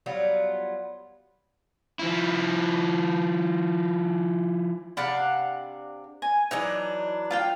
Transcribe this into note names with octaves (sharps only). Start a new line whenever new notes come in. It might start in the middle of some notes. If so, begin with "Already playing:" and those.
F#3 G3 B3 F4
F3 E4
C3 D4 D5 F5 F#5 B5
G#5
E3 F#3 D4 D#4
F4 F5 G5